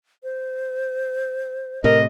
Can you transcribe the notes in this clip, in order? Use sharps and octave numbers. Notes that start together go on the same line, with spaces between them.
C5
A2 C3 A#4 D#5